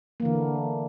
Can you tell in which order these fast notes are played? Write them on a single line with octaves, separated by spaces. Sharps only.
A#3 E3 D3